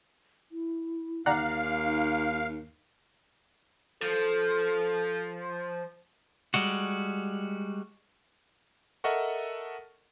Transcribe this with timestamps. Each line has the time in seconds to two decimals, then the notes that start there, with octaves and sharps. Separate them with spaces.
0.52 E4
1.26 D#2 D#4 D5 F5 F#5 A#5
4.02 F3 A4
6.54 G3 G#3 F#4
9.04 A4 A#4 D#5 E5 F#5 C#6